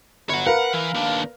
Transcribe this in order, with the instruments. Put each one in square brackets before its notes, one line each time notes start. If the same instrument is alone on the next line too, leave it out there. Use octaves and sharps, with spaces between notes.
[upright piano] G1 [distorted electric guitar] C#5 F#5
[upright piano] A#4 B4 F5 [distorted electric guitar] F#5
[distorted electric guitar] E3
D#2 D4